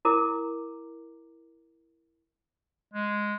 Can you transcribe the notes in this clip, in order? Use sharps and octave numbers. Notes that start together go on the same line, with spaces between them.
E4 A#4 A#5 D6
G#3